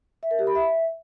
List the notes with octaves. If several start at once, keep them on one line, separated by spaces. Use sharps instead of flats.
E5
A#4
G4
B5
E5